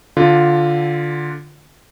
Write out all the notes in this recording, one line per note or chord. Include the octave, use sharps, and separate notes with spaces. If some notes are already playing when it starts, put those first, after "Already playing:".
D3 F4